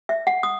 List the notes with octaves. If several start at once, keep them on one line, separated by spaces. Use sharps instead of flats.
E5
F#5
D#6